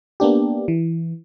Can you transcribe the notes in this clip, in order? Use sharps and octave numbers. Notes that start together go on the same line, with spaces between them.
A#3 B3 D4 G4
E3